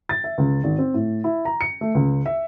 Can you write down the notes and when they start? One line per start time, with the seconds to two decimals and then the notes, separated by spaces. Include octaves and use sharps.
0.09 A6
0.24 E5
0.38 C#2
0.64 G#1
0.79 C4
0.94 A2
1.24 E4
1.45 A#5
1.61 C#7
1.81 A3
1.95 C#2
2.26 E5